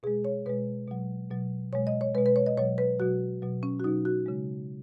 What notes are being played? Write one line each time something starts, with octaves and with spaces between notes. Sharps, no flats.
B2 G#3 G#4
C#5
B2 G#3 B4
B2 F#3
B2 F#3
B2 G#3 C#5
D#5
C#5
B2 G#3 B4
B4
C#5
D#5
B2 F#3 C#5
B4
B2 F#3 F#4
B2 F#3
C#4
F#4
B2 F#3 D#4
F#4
C#3 G#3